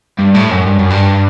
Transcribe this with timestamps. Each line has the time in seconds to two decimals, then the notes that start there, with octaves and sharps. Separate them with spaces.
0.19 G2
0.35 A2
0.51 F#2
0.67 G2
0.79 F#2
0.90 G2